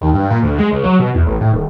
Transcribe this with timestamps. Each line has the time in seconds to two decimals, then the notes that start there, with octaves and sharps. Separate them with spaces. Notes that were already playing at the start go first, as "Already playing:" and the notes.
0.01 D#2
0.13 G2
0.30 A#2
0.43 D2
0.59 G#3
0.71 C#2
0.84 F#3
0.99 B2
1.14 E2
1.27 A1
1.41 A2
1.52 D#1